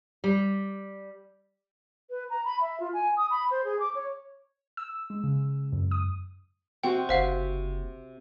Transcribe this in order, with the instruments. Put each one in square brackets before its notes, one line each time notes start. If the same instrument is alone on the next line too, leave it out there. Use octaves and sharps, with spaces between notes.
[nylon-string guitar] G3
[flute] B4
A#5
B5
E5
F4
G#5
D#6
B5
C5
G#4
D6
C#5
[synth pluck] E6
G#3
C#3
F#2
D#6
[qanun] C3 C4 F#4 [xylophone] G5
[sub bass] F#1 [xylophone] C5 F5 F#5